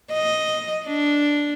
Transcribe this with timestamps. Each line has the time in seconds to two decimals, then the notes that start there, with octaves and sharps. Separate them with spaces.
0.12 D#5
0.86 D4